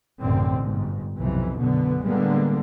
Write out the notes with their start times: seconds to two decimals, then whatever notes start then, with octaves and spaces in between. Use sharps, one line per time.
0.20 A1 F#2 B2 D3 C4
0.60 G1 G#2
1.19 B1 F2 C3 E3
1.58 B1 F#2 B2 D3 B3
2.05 A2 D3 G3 G#3 A#3 B3